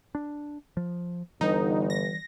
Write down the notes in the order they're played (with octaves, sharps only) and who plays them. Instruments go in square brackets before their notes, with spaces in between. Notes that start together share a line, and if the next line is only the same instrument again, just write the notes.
[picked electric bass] D4
F3
[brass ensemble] G1 [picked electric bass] E3 G3 [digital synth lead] D#4
[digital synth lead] A#6